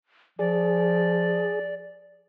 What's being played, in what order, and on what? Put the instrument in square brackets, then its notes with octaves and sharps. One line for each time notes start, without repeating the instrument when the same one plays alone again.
[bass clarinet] F3 [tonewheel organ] G#4 [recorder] D5